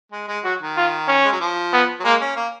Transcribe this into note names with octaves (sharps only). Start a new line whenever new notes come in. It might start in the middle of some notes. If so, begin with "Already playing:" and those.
G#3
G#3
F#3 F#4
D#3
F4
C#4
G#3
F#3
F3
B3
F#3
G#3 A#3
C#4
A#3